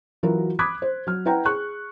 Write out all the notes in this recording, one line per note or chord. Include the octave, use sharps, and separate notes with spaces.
E3 F#3 F4 F#4 A#4
B5 D6 D#6 F#6 G#6 B6
C5
F#3 F6
E4 B4 F#5 G5 A#5
G#4 C#6 F#6